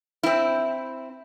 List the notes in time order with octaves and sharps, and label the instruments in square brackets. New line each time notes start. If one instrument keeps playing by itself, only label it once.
[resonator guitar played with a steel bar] C4 E4